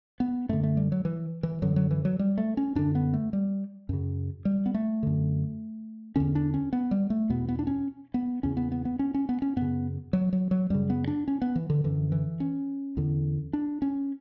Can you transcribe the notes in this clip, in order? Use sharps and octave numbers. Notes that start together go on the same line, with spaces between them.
B3
F#2 D3 A3
A3
G3
F#3
E3
E3
F#2 D3 F#3
F#3
E3
F#3
G3
A3
C#4
F#2 D3 D4
B3
A3
G3
F#2 C#3
G3
B3
A3
F#2 D3
E2 D3 C#4
D4
C#4
B3
G3
A3
E2 B2 B3
B3
D4
C#4
B3
E2 C#3 C#4
B3
B3
B3
C#4
C#4
B3
C#4
F#2 C#3 B3
F#3
F#3
F#3
F#2 C#3 G3
B3
D4
C#4
B3
E3
D3
F#2 D3 E3
E3
C#4
E2 D3
D4
C#4